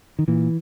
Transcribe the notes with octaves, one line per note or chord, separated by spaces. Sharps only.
D#3
A#2 E3